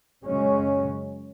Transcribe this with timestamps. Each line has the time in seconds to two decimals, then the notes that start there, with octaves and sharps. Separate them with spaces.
0.24 F#2 C#3 G#3 C#4